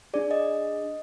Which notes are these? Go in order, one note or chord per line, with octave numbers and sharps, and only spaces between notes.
D4 G#4 D5
D#5